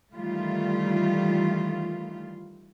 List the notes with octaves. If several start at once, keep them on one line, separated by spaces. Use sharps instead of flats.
D#3 E3 G3 A3 F4